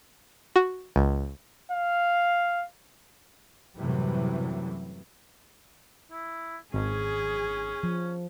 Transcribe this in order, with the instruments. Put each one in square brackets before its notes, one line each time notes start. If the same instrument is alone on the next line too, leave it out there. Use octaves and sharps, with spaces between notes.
[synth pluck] F#4
C#2
[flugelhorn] F5
[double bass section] F#2 A2 C3 E3 F#3 G3
[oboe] E4
[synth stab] G#1 [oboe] C#4 [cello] G#4
[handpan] F3